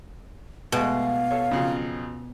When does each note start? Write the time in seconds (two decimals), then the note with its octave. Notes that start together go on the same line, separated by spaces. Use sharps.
0.72 B2 G#3 A3 F5
1.31 A4 C#5
1.51 F2 C#3 F#3